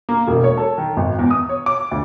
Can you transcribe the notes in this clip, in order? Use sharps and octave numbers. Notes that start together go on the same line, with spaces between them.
A#3
E1
C#5
A4
D#3
G#1
E2
D#6
C#5
D6
D2